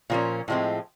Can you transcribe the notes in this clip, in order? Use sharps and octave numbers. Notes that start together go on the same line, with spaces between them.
A#2 F3 A#3 C#4
A2 F3 G#3 C4